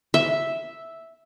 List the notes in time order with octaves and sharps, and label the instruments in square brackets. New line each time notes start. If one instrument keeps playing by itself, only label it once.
[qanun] E5